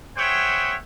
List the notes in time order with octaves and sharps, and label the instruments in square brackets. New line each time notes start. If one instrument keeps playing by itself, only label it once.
[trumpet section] G#4 C5 C#5 E5 F#5 G5